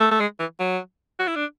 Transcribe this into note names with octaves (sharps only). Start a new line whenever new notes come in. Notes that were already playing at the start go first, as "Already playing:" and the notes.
A3
A3
G#3
E3
F#3
F#4
E4
D4